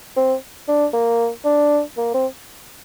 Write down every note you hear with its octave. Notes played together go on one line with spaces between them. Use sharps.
C4
D4
A#3
D4
A#3
C4